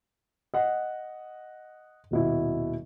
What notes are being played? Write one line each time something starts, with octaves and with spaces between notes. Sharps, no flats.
D#5 F#5
D#1 B2 E4